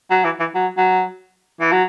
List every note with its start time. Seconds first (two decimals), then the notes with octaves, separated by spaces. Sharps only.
0.10 F#3
0.24 E3
0.40 E3
0.55 F#3
0.77 F#3
1.61 E3
1.72 F#3